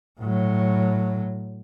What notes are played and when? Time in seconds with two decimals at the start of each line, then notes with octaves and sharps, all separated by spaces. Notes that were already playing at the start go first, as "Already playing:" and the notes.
0.20 A2 F#3